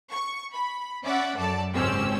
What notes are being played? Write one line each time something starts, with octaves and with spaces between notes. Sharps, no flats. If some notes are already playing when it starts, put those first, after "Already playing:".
C#6
B5
C#4 D5 E5 F#5
F#2 A4 D5 A5
G#1 C#2 C4 C#4 G4 E6